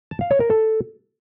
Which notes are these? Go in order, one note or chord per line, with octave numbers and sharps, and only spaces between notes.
A5
F5
C#5
A#4
A4